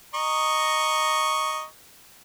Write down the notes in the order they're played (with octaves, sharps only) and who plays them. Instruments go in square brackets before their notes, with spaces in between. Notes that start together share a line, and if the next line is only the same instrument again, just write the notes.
[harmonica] D#5 A#5 C#6